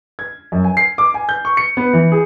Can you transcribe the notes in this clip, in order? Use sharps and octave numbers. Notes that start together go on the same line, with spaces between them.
G#6
F#2
G#5
C7
D6
G#5
G6
C#6
C#7
B3
E3
G#4